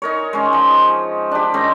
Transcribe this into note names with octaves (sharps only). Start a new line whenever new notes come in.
D#4 A#4 C#5
G#3 C#4
F3
D4 G4
D#3 G#3 C4 C#4